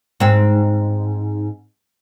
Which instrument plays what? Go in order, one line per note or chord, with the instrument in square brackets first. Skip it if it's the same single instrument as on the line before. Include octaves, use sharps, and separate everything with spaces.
[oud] G#2 C4